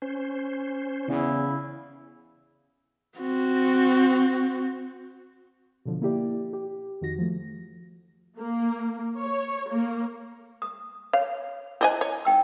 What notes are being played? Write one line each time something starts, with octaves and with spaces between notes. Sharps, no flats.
C#4 C5
E2 C#3 E4
C4 F#4
B2 D3 F3
A#3 E4 G4 D5
G4
F2 D#3 F#4 A#6
F3 A3
A#3
C#5
A#3
D#6
C#5 F5
C4 E4 C5 D#5 G#5
C#5
D#4 G5 E6